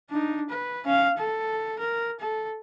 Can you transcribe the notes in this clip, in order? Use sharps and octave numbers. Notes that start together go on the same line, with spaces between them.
D4 D#4
B4
C#4 F5
A4
A#4
A4